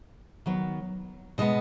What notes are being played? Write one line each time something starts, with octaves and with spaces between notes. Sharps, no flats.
D#3 F#3 B3
B2 G#3 B3 D#5